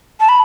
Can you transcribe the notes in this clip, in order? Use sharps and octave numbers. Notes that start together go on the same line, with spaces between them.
A5
B5